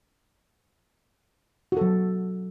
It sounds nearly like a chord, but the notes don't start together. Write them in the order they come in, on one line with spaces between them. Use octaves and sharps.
F#4 A4 F#3